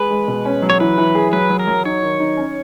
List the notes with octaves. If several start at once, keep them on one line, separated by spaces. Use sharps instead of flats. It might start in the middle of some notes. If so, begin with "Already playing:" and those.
Already playing: G#3 G#4 B4
G#3
B2
C#4
F#3
C#5
E3 B4
E3
G#4
F#3 B4
F#3
A#4
F#3
D#4 C#5
D#3
D#4
C#4